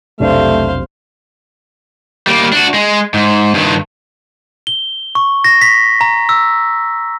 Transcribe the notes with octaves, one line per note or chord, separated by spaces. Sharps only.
F1 B1 C3 A3 D4 C5 F5
G3 A#3
D4 F#4
G#3
G#2
G2 D#3
G7
C#6
A#6
B6
A#5
E6